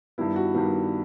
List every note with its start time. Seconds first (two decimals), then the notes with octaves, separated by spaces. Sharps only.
0.18 G2 D#3 G3 B3 E4
0.36 F#4
0.54 G2 D#3 G3 B3